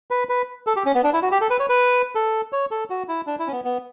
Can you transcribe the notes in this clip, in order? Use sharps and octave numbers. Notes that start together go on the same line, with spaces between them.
B4
B4
A4
G4
C#4
B3
D4
E4
F#4
G4
A4
B4
C#5
B4
A4
C#5
A4
F#4
E4
D4
E4
C#4
B3
B3